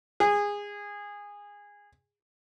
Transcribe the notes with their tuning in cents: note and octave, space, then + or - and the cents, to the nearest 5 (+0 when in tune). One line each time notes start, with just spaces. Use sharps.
G#4 -20